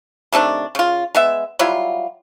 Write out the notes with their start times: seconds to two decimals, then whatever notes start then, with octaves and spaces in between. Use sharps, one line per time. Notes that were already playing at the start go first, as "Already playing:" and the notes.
0.32 C3 D#3 A3 D4
0.75 C#3 F4
1.15 G#3 B3 E5
1.59 F#3 G3 E4 F4